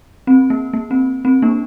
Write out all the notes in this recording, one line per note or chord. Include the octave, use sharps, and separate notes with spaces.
C4
A#3
A#3
C4
C4
A#3 D4